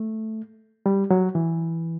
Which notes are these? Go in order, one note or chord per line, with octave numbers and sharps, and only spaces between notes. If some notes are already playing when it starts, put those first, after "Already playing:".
Already playing: A3
G3
F#3
E3